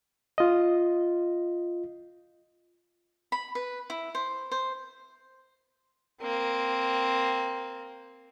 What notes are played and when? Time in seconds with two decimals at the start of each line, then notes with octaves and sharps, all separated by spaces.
0.38 F4 D#5
3.32 B5
3.55 B4
3.90 E4
4.15 C5
4.51 C5
6.21 A#3 C4